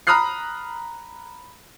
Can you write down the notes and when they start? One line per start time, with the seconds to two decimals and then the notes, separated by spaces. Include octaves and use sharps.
0.07 A#5 B5 D#6 F6 F#6 C7